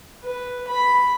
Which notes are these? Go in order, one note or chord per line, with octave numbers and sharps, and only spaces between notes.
B4
B5